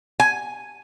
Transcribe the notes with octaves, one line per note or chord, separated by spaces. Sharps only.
G#5